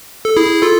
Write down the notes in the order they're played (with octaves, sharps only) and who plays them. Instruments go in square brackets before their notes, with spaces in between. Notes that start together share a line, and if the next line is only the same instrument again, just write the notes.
[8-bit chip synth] A4
E4 G#4
F4 A4